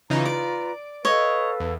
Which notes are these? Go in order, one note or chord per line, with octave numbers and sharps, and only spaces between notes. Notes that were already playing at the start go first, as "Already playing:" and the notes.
C#3 E3 D#4 F4 B4 A#5
D5 D7
A4 B4 C#5 D#5 F5
E2